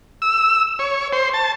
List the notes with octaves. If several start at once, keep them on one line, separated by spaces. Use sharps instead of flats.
E6
C#5
C5
A5